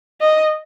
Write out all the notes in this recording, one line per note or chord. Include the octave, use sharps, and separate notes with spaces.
D#5